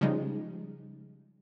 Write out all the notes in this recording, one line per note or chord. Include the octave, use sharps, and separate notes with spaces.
C#3 F3 G3 G#3 D#4